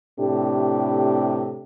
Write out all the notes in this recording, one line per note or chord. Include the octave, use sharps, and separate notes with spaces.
A2 C3 D4 G4